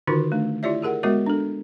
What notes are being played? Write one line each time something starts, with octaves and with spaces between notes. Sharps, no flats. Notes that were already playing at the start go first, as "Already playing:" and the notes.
D3 D#3 D#4 F4 F#4 A#4
A3 D4
E4 F4 G4 C#5 D5 E5
G4 G#4 A#4 F#5
G#3 B3 F#4 A#4 C#5 E5
D4 A4